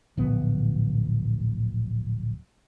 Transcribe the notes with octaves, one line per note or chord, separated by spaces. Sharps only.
D1 A#1 B3